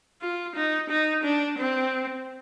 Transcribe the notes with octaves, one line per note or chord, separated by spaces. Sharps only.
F4
D#4
D#4
D4
C4